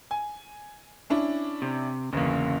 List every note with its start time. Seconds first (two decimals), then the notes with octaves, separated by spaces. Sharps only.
0.11 G#5
1.10 C#4 D4 E4
1.62 C3
2.13 G1 E2 C#3 A#3